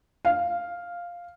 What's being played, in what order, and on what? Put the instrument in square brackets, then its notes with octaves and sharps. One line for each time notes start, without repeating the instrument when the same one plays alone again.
[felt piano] F5